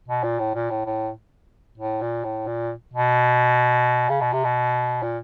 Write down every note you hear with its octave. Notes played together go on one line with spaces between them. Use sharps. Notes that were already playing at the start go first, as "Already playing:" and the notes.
B2
A#2
A2
A#2
A2
A2
A2
A#2
A2
A#2
B2
C#3
B2
C3
B2
A#2